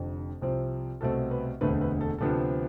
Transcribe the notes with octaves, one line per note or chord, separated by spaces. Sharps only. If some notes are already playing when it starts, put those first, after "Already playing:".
Already playing: F1 F2 D3
C2 C3 F3 C4
C2 B2 A3 C4 A4
B4
E1 D2 D3 A3 C4 B4
B4
A4
D2 C3 F3 B3 D4 A4